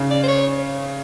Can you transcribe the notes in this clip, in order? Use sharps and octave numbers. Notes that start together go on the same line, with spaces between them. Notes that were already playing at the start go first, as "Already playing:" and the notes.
Already playing: C#3
D5
C5
C#5